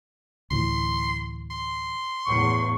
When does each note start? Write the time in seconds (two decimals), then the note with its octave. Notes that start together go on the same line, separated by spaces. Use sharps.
0.51 D2 A2 E3 C6
1.50 C6
2.25 E2 A2 C#6